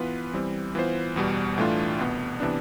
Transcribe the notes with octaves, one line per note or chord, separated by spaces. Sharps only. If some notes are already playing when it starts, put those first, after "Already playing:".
Already playing: E3 B3 F4 B4
E3 G3 C4
E3 B3 F4 C5
E2 B2 G3
A2 E3 A3 D4 F4
C2 B2 B3
C3 E3 B3 D4